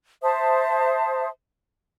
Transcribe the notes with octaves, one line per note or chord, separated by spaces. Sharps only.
C5 E5 A5 D#6